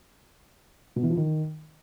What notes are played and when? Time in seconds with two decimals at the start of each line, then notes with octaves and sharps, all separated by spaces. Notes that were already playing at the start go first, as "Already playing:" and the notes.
0.96 B2
1.03 E3
1.10 F3
1.17 D#3